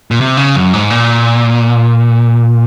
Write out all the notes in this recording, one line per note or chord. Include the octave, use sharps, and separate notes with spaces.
A#2
C3
C#3
F#2
G#2
A#2